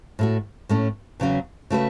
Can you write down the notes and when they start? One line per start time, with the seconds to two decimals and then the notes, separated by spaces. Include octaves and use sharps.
0.19 A2 A3 F#4
0.69 A2 A3 C#4
1.20 E2 C#3 F#3 C#4
1.70 C#3 A3 F#4 B4